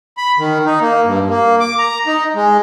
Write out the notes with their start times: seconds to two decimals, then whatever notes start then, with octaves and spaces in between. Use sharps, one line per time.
0.17 B5
0.38 D#3
0.65 D#4
0.81 A#3
1.05 G2
1.29 A#3
1.60 D6
1.79 A#5
2.07 D#4
2.35 G#3